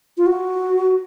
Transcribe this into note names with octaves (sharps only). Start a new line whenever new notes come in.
F4
F#4